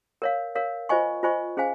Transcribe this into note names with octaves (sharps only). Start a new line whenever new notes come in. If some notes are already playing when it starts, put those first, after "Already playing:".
A#4 C#5 F5
A#4 C#5 F5
F4 C5 D#5 G#5 C#6
F4 C5 D#5 G#5 C#6
C#4 G#4 C5 F5 G#5